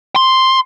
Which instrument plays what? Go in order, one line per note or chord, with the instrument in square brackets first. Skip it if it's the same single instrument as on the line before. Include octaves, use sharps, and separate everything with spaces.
[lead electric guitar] C6